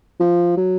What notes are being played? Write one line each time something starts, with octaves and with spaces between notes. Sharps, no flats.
F3
F#3